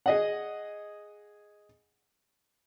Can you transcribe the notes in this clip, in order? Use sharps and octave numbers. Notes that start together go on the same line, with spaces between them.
G#4 D#5 F#5